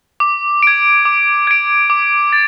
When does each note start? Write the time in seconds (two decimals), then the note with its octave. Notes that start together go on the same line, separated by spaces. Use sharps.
0.20 D6
0.63 G#6 D7
1.05 D6
1.47 G#6 D7
1.90 D6
2.33 A6